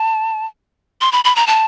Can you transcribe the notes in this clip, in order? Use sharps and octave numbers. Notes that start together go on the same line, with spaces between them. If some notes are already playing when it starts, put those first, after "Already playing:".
Already playing: A5
C6
B5
B5
A#5
A5